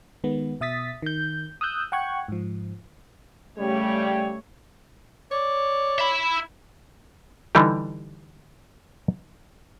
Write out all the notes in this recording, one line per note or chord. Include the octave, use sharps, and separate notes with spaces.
D#3 G#3 B3
B2 E5 D#6 A6 B6
D#3 G6
D#6 E6 F#6 G6
F#5 G5 C#6 F#6 G#6
G#2 F3
C#3 G3 A3 C#5
C#5 D5
E5 B5
E4
D3 E3 G3 D#4 G4